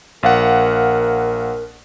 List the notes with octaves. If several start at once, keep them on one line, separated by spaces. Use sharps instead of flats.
A#1 A#4 F5 F#5